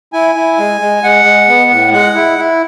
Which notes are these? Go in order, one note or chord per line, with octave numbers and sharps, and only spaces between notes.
E4 G#5
E4
G#3
G#3
G#3 F#5
G#3
B3
A2
G#3 F#5
E4
E4